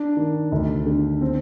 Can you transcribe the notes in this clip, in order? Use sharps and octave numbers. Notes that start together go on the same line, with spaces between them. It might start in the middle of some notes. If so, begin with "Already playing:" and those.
Already playing: D4
D#3
D2
D3
C4